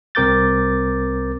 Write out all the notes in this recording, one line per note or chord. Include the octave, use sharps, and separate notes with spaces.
C2 C4 A#4 D6 G6 A6